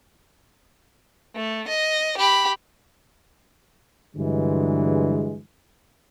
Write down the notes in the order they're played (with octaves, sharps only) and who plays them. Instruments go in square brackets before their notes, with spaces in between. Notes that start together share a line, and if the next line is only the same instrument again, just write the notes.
[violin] A3
D#5
G4 B5
[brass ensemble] G2 D3 E3 F#3 G#3